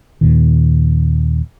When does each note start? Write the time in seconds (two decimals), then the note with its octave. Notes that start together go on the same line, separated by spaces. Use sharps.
0.21 D#2 A#2 D#3